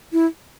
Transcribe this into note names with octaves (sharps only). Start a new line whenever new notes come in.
E4